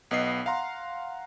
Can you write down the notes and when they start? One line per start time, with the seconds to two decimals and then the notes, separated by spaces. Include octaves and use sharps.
0.11 B1 B3 D#5 C7
0.46 F5 F#5 A#5 C6